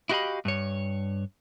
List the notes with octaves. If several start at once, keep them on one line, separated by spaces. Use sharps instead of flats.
E4 F#4 G4 D#5 F5 B5
G2 C#5